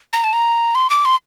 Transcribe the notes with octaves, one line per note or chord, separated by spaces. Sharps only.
A#5
A5
A#5
C6
D6
C6